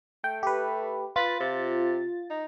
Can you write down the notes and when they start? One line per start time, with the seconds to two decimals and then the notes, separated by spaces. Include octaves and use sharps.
0.24 A3 G5
0.43 G4 B4
1.16 F4 B4 A6
1.40 C3
2.30 D#4